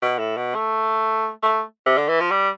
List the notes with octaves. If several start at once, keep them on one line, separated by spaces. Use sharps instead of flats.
B2
A2
B2
A3
A3
C3
D3
E3
F3
G3